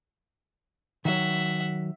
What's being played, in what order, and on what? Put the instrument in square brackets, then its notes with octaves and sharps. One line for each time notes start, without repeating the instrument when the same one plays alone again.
[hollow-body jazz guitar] D#3 F#3 [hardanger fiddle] E5 F#5